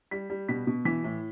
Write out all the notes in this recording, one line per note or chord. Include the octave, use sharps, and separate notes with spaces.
G3 B6
G3
B2 B6
B2
E3 B6
A2